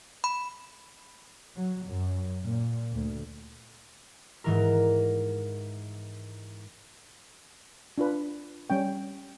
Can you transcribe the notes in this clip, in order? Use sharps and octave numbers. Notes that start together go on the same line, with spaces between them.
B5
F#3
F#2
A#2
D2
G#2 E3 A#4
D4 F4 B4
G3 C#4 G5